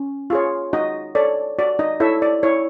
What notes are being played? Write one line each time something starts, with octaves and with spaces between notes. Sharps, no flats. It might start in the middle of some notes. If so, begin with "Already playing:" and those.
Already playing: C#4
F4 G#4 C#5
D#4 F#4 D#5
A4 C#5 D5
F#4 D5
D#4 D#5
E4 A4 C#5 E5
D5
E4 C#5